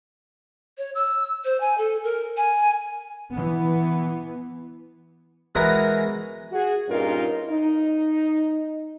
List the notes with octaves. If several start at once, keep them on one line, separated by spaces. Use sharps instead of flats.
C#5
E6
C5
G#5
A4
A#4
G#5
E3 B3
E3 G#3 B3 F#4 A#4 B4
F#4 G#4
G2 A#2 C#4 D#4 F4 A#4
D#4